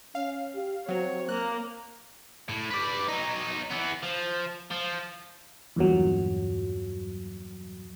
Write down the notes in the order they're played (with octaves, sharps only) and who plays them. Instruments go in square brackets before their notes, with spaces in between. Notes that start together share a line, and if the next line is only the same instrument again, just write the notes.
[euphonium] C#4 [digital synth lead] F5
[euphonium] G4
[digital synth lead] F#3 [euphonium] C4 [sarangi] C#5
[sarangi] A#3 [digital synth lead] F#6
[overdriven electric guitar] A2
B4 D5
F#3 D#4
E3 B3
F3
F3
[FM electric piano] E2 G2 A#2 F#3